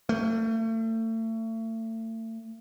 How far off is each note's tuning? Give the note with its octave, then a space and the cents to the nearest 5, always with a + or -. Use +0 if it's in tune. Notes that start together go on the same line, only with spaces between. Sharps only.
A3 +35